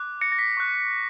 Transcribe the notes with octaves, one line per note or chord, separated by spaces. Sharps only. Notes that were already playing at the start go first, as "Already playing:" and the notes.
Already playing: D6 F#6
A#6 C#7
A#6
B6
C#6 F#6